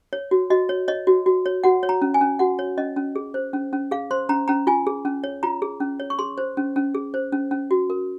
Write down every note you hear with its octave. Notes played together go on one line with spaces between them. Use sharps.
C#5
F#4
F#4 D#5
C#5
C#5 D#5
F#4
F#4
C#5
F#4 F#5
C#5
A#5
C#4
G#5
C#4
F#4 F#5
C#5
C#4 D#5
C#4
G#4
C5
C#4
C#4
G#4 F5
C5 C6
C#4 A#5
C#4 A#5
F4 G#5
G#4
C#4
C#5
F4 A#5
G#4
C#4
C#5
C#6
G#4 C6
C5
C#4
C#4
G#4
C5
C#4
C#4
F#4
A#4